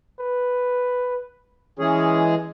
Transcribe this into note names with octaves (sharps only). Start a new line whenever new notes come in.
B4
E3 G#3 C#4 G#4